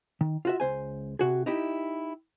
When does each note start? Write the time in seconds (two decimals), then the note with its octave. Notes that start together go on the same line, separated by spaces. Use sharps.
0.21 D#3
0.45 F4 F#4 E5
0.60 C#2 C5 G#5
1.19 C3 F#4 G#4
1.46 D#4 E4 G4